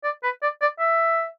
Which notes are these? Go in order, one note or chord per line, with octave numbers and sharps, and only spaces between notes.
D5
B4
D5
D5
E5